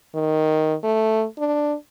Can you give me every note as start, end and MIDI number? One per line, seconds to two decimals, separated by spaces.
0.15 0.75 51
0.83 1.25 57
1.38 1.75 62